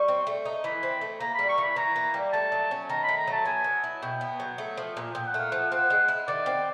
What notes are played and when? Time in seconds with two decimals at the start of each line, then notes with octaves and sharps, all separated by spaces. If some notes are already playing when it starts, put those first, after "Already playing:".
Already playing: G3 C#6
0.08 C4
0.27 A3
0.45 D#4
0.64 E3 B5
0.83 C4
1.01 A3
1.20 A#3 A#5
1.35 G3 B5
1.49 C#6
1.58 E3
1.63 B5
1.76 E3 A#5
1.96 A#3
2.14 G3
2.33 A3 A5
2.52 F#3
2.71 C#4
2.89 D#3 A#5
3.03 B5
3.08 A3
3.18 A#5
3.27 F#3
3.32 A5
3.45 B3 G#5
3.64 F#3
3.84 E4
4.02 B2 G5
4.21 B3
4.40 F#3
4.58 A3
4.77 F3
4.97 A#2
5.15 A#2 G5
5.27 F#5
5.34 A3 F5
5.51 F3 F#5
5.71 C4 F#5
5.90 G#3
6.08 E4
6.28 D#3 D5
6.46 C4